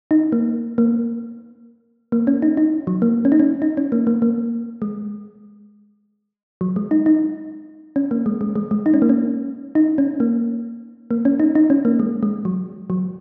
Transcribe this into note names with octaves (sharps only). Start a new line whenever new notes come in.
D#4
A#3
A#3
A#3
C#4
D#4
D#4
F#3
A#3
C#4
D#4
C#4
D#4
C#4
A#3
A#3
A#3
G#3
F#3
G#3
D#4
D#4
C#4
A#3
G#3
G#3
G#3
G#3
D#4
C#4
A#3
C#4
D#4
C#4
A#3
A#3
C#4
D#4
D#4
C#4
A#3
G#3
G#3
F#3
F#3